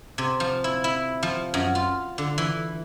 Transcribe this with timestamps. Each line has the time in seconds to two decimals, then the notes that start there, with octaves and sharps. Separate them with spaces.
0.18 C3
0.40 F3
0.64 E4
0.84 E4
1.23 F3
1.54 F#2
1.75 F4
2.18 D3
2.38 E3